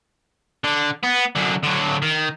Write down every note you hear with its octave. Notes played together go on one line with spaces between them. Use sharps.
D3
B3
F#2 D3
D3 F#3
D#3